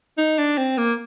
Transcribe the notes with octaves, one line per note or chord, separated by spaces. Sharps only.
D#4
D4
C4
A#3